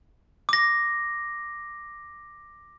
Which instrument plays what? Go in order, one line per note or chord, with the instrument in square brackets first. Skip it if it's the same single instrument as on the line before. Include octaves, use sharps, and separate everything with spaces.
[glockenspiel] D6 A#6